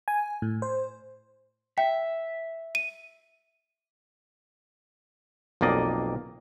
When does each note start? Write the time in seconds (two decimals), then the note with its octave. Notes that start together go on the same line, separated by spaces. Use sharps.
0.08 G#5
0.42 A2
0.62 C5
1.78 E5 G5
2.75 D#7
5.61 B1 F2 A#3 D5 D#5